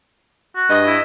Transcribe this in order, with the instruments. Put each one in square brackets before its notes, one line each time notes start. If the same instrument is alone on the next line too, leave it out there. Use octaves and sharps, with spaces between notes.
[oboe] F#4
[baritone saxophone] G2 [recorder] D#5
[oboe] E4